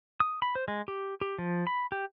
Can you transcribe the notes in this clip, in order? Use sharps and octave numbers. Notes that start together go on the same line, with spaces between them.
D#6
B5
C5
G#3
G4
G4
F3
B5
G4